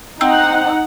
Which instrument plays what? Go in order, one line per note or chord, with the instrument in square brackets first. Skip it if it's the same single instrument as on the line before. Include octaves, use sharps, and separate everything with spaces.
[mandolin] C4 [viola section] D#4 F#5